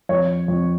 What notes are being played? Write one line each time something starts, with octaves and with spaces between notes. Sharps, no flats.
F2 C#5
F2